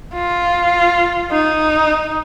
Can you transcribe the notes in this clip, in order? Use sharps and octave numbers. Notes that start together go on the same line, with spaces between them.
F4
D#4